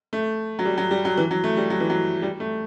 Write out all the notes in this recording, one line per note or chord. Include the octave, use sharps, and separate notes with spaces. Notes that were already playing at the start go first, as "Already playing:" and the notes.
A3
F#3
G3
F#3
G3
F#3
E3
F#3
A3
G3
F#3
E3
F#3
G3
A3